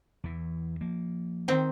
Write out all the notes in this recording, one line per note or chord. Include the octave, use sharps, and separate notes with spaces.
E2 E3
F3 A#3
D#3 C4